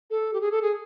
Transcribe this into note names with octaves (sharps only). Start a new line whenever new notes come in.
A4
G4
G#4
A4
G#4